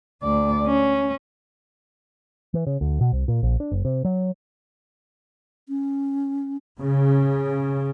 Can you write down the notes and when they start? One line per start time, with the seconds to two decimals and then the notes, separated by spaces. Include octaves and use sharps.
0.23 D2 D5
0.66 C#4
2.54 E3
2.67 C#3
2.81 D2
3.01 B2
3.12 C2
3.28 A#2
3.43 A#1
3.60 D4
3.72 F#1
3.85 C3
4.05 F#3
5.69 C#4
6.80 C#3